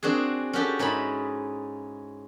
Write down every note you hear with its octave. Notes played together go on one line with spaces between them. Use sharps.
C4 D4 F#4 G#4
C#4 F#4 G4 A4
G#2 C#4 D#4 E4 B5